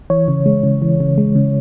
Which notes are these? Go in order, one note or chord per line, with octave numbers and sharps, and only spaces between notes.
E3 C#5
C#3
G#3
C#3
E3
C#3
G#3
C#3